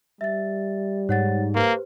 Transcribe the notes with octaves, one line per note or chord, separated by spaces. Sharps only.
G3 E5 A6
G#2 C#5 F#5 A6
A#3 G4 B4 C5